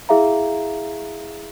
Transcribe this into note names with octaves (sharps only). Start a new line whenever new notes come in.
E4 G#4 E5 F5 A#5